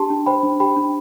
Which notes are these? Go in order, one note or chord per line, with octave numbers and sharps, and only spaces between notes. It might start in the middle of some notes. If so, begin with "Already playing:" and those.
Already playing: D4 G4 A5 C6
D4
C5 G5 B5
D4
G4 G5 B5
D4